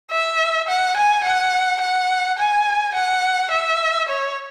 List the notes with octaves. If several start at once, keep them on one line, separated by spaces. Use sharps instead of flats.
E5
F#5
G#5
F#5
F#5
G#5
F#5
E5
C#5